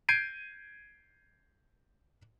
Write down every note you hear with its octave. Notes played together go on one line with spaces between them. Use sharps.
G6 G#6 C7 D7 D#7